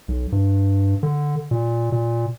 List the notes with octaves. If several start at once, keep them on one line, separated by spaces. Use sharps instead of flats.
B1
G2
D3
A#2
A#2